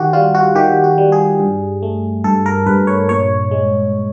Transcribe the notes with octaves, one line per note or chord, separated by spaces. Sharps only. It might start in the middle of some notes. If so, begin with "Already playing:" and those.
Already playing: D#3 F#4 G4
G3 F4
F#4
D#3 G4
F#4
G3
G#4
G2
A3
G2 A4
A#4
G2 B4
C#5
A#2 C#5
G#3